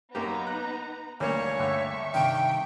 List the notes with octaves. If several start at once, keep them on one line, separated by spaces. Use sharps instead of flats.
F#2 A#3 B3 D#4 G4 A#5
F#6
D2 G3 A#3 C#4 C#5
G2 D3 A3 E5 C#6
G2 C3 D#3 G5